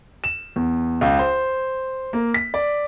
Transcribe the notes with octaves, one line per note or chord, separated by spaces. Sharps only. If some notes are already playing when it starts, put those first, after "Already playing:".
E7
E2
C#2
C5
A#3
B6
D5